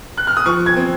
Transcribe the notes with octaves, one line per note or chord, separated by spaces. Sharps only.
F#6
F6
D#6
F3 C#6
G#6
C4